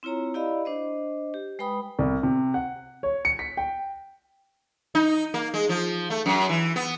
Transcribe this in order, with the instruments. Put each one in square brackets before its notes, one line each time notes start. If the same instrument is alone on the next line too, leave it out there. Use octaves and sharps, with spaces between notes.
[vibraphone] C4 E4 F4 C#5 A#5
E4 G4 D5 D#5 F5 B5
D4 C5 D#5
G4
G#3 B4 G5 B5 D#6
[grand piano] C2
C3
F#5
C#5
C#7
B6
G5
[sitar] D#4
A#3
G#3
F3
A3
F#2
E3
B3